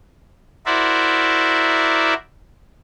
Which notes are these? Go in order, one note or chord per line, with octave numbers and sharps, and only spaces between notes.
E4 F#4 A#4 C5 D5 E5